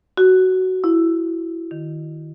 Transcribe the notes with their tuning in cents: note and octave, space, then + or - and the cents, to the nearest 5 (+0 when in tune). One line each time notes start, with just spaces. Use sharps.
F#4 +10
E4 +10
D#3 -15